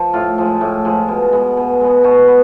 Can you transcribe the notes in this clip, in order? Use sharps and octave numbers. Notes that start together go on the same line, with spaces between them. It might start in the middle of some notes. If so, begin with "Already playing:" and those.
Already playing: F3
A2 F4
F3 G#3
A2
F3 G#3
B2
G#3 B3
B2
G#3 B3
B2 F#4
B3